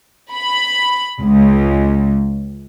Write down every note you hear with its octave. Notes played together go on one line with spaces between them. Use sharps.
B5
C#2